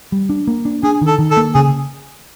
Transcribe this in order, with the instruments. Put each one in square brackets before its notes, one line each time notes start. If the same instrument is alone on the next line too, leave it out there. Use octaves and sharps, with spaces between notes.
[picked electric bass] G3
D4
A#3
D4
[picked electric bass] D4 [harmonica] G#4
[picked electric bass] D#3
[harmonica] A4
[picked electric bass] D#3
[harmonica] A4
[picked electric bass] A#3
[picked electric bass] C#3 [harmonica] G#4